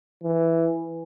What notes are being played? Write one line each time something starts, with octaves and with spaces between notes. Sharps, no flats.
E3